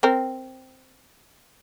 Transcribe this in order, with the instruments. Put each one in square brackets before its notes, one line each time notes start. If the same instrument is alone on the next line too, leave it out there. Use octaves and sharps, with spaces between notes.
[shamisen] C4 A#4